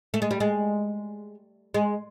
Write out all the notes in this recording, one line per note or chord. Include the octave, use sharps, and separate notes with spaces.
A3
G#3
G3
G#3
G#3